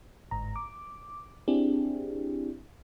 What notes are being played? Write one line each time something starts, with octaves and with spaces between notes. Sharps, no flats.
G1 G#2 A#5
D6
C4 D4 E4 G4 G#4